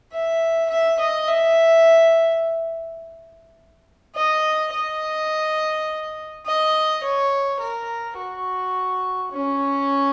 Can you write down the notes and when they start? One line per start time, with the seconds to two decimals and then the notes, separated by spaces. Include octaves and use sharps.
0.13 E5
0.70 E5
1.00 D#5
1.28 E5
4.15 D#5
4.73 D#5
6.46 D#5
7.03 C#5
7.60 A#4
8.18 F#4
9.32 C#4